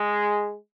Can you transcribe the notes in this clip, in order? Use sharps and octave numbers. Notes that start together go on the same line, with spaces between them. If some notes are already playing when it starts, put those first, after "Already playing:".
Already playing: G#3